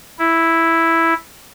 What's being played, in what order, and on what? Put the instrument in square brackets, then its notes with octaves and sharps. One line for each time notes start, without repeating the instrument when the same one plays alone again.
[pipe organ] E4